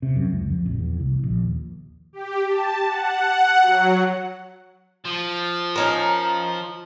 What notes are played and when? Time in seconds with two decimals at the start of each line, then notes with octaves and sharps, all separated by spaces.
0.02 C3
0.16 F#2
0.31 C#2
0.50 F2
0.66 A#1
0.78 E2
1.00 C2
1.23 A#1
1.41 D#2
2.13 G4
2.48 A5
2.86 F#5
3.61 F#3
5.05 F3
5.76 C#4 D#4 A#4